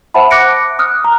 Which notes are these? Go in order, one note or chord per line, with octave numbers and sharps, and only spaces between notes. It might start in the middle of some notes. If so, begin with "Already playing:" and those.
C5 E5 F#5 A5 B5
D6 F#6 A#6 C#7 D7
D#6 F6 F#6
A#5